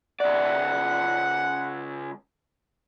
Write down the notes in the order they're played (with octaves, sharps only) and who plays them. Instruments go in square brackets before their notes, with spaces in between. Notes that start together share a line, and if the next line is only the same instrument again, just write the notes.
[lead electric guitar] C#2 D5 [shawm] F#5